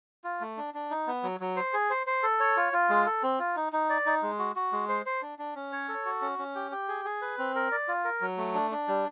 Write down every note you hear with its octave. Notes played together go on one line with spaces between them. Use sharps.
F4
A3
D4
D4
D#4
B3
F#3
F#3
C5
G#4
C5
C5
A4
C#5
F4
F4
G#3
A4
C4
F4
D#4
D#4
D5
D#4
G#3
F#4
F#4
G#3
C5
C5
D4
D4
C#4
C#5
A4
F#4
C#4
C#4
G4
G4
G#4
G#4
B4
C4
A#4
D5
F4
A#4
F#3
A3
D4
D4
G3